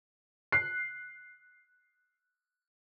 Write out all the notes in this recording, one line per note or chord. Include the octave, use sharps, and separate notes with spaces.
F#6 C7